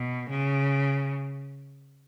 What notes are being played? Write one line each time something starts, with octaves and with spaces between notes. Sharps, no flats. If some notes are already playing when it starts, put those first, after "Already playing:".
Already playing: B2
C#3